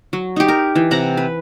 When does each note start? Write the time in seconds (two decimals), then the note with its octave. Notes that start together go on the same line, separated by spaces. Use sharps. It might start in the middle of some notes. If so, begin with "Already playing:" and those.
0.13 F#3
0.36 D#4 G4
0.48 A#4
0.75 E3
0.91 C3 F#5 A#5
1.17 B4